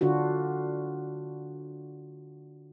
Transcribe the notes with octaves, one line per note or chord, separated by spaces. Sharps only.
D3 D4 F4 F#4